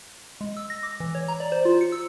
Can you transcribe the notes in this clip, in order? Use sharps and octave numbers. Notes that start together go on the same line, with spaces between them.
G#3
E6
A#6
D6
E3
C#5
A#5
D5
C5
F4
C#7
E6